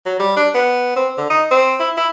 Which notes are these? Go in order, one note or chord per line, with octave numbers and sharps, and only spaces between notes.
F#3
G3
D4
B3
C4
D3
D#4
C4
E4
E4